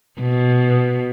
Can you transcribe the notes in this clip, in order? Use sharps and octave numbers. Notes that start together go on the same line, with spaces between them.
B2